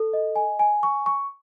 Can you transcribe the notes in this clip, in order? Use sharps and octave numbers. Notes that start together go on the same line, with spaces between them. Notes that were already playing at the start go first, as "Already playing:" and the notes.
Already playing: A4
D#5
G#5
G#5
C#6
C#6